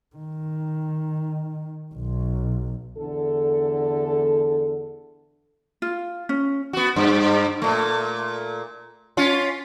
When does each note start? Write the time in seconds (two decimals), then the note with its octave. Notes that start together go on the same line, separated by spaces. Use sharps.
0.16 D#3
1.94 B1
2.97 E2 D3 A4
5.82 F4
6.29 C#4
6.73 B3 F#4
6.96 G2
7.62 A#2 A3
9.17 C#4 F4